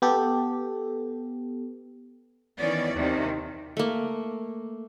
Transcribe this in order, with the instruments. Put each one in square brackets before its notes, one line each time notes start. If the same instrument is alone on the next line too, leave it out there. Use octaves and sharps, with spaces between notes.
[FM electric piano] B3 G4 A4
[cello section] D#3 E3 B3 C#4 D5
D#2 C3 D#3
[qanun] A3 A#3